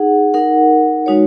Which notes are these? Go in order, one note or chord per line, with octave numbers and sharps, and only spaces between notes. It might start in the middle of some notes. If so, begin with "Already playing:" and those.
Already playing: D#4 G#4 F#5
D#4 A#4 F#5
G#3 D#4 F#4 C#5